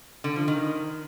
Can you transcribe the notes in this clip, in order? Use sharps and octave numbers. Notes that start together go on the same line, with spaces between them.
D3
F3
D#3